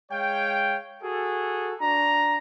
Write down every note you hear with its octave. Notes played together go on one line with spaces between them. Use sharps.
G#3 C#5 F5 G5
F#4 G#4 A4
D4 F#4 A#5